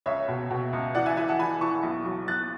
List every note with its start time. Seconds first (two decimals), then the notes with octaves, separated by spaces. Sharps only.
0.06 C#2 C#5 E5
0.28 B2
0.50 B2
0.73 C#2
0.95 E3 D5 F#5
1.06 E5 G#5
1.17 E3 E5 G#5
1.28 F#5 A5
1.39 E3 G#5 B5
1.61 E3 A5 C#6
1.83 B1
2.06 F#3
2.27 B1 F#6 A6